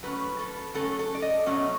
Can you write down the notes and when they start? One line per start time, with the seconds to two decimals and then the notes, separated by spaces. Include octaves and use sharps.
0.03 F#3 A3 C#4 B4
0.39 A4
0.74 F#3 A3 C#4 A4
0.99 A4
1.15 D5
1.22 D#5
1.46 B2 F#3 A3 C#4